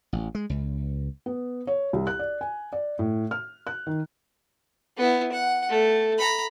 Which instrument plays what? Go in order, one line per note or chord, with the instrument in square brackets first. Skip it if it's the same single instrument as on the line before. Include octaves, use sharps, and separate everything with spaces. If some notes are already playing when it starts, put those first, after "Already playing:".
[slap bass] A1
G#3
C#2
[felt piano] B3
C#5
C2
F#6
D5
G#5
D5
A2
F6
F#6
D#3
[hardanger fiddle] B3 E4
F#5
A3
A#5 B5